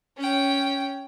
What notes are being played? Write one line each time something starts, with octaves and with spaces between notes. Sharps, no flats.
C#4 G5